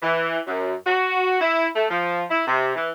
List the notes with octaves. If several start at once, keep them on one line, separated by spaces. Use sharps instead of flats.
E3
F#2
F#4
E4
A3
F3
E4
C3
E3